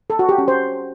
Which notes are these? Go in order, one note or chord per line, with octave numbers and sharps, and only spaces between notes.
A4
F#4
G4
C#4
C5